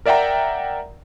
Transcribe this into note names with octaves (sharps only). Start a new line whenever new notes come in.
A#4 D5 E5 F#5 G5 A#5